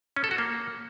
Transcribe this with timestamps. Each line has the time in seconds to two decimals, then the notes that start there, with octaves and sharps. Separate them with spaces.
0.16 C#4
0.24 A4
0.31 F#4
0.38 A#3